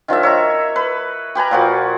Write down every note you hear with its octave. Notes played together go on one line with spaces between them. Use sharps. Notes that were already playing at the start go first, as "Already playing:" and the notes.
D#3 F3 D4 E5
C#5 E5 A#5
B4
G4 B4 G#5 A#5
A#2 F3 F#4